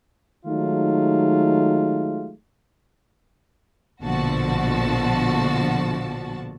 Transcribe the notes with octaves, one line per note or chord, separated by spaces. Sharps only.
D#3 F#3 G#3 A3 D#4 F4
A#1 B2 D3 F3 F#4 A5